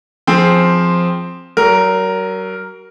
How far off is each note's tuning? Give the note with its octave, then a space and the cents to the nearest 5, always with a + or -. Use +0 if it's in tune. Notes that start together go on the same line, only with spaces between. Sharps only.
F3 +5 C4 +0 G#4 +5
F#3 +35 A#4 +0